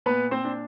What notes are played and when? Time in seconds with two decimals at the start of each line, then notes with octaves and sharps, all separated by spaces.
0.06 A#2 B3 B4
0.31 C4 C5
0.45 D4